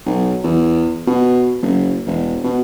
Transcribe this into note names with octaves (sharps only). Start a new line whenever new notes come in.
B1
E2
B2
F#1
E1
B2